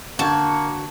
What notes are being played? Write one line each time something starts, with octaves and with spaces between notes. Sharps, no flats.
D3 A#3 F#4 A5 G6 G#6